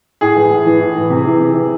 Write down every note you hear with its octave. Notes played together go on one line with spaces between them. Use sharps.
A2 G#4
E3
A2
E3
A2
E3
C3
E3
C3
E3